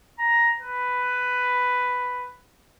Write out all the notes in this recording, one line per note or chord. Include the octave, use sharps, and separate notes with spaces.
A#5
B4